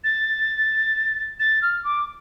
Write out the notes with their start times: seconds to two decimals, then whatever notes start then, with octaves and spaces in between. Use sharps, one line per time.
0.04 A6
1.39 A6
1.62 F6
1.84 D6